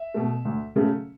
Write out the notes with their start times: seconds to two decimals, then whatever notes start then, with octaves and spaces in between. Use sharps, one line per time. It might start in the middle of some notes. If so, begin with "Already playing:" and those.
Already playing: E5
0.14 B2 A3
0.45 D2
0.76 C#3 F#3 A3